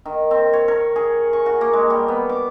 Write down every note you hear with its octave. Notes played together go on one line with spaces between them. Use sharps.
D#3
C4
C#5
A#4
G#4
C#6
F#4
A#3
G#3
G3
B3
D6